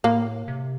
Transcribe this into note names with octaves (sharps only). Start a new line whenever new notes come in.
A2 A#3
C3